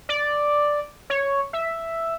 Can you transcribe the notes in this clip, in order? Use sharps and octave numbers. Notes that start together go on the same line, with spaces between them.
D5
C#5
E5